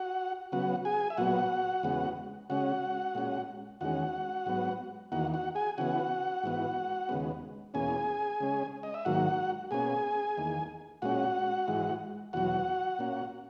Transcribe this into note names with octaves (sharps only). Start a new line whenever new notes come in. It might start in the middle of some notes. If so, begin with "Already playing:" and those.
Already playing: F#4 F#5
C#3 F#3 B3 F#4 F#5
G#4 G#5
E5
A#2 F#3 B3 F#4 F#5
E2 C#3 G#3 B3
C#3 G#3 C#4 F#4 F#5
A#2 G#3 C#4
E2 D#3 G#3 C#4 F#4 F#5
G#2 F#3 B3
E2 D#3 A#3 F#4 F#5
F#4 F#5
G#4 G#5
C#3 E3 B3 F#4 F#5
G#2 E3 B3
D#2 C#3 G#3 B3
E2 B2 A#3 C#4 G#4 G#5
C#3 G#3 C#4
D#5
E5
G#2 D#3 F#3 A#3 F#4 F#5
B2 A#3 C#4 G#4 G#5
E2 D#3 A#3
A#2 G#3 C#4 F#4 F#5
G#2 E3 G#3
E2 B2 F#3 F#4 F#5
A#2 A#3 C#4